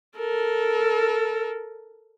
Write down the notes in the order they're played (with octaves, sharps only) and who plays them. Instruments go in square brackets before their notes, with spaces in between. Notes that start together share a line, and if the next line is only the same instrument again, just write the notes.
[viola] A4 A#4